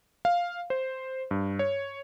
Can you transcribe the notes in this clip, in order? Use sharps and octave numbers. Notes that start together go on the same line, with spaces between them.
F5
C5
G2
C#5